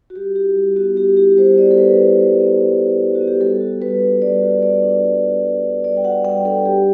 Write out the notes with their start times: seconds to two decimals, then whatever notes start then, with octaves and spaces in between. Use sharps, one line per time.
0.10 F#4
0.16 G3 G4
0.36 E4 G4
0.56 G3
0.76 B3 F#4
0.97 G3 G4
1.17 E4 G4
1.37 G3 C5
1.58 B3 D5
1.71 A4
1.78 G3 B4
1.98 E4
2.19 G3
2.39 B3
2.59 G3
2.79 E4
3.00 G3
3.15 F#4
3.20 B3
3.27 G4
3.40 G3 A4
3.61 F#4
3.80 G3 B4
4.01 D4
4.22 G3 D5
4.42 F#4
4.62 G3 D5
4.82 D4
5.03 G3
5.23 F#4
5.44 G3
5.64 D4
5.84 G3 D5
5.97 G5
6.04 F#4 F#5
6.25 G3 G5
6.45 D4 A4
6.65 G3 G4